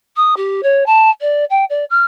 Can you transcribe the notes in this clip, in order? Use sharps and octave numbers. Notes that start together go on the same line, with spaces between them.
D#6
G4
C#5
A5
D5
G5
D5
F6